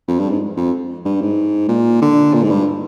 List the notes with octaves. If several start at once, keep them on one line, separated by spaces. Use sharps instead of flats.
F2
G2
G#2
F2
G2
G#2
A#2
D3
A#2
G#2
G2